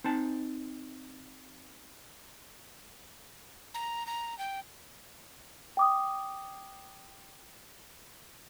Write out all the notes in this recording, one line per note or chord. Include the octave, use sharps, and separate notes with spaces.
C4 D#4 A5
A#5
A#5
G5
G5 D6 D#6